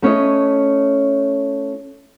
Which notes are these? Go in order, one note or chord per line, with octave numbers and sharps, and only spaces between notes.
A3 C#4 E4 D#5